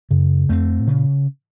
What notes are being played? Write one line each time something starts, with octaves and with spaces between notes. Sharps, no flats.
F#2 C#3
F2 A3 C4
A2
A#2 C#3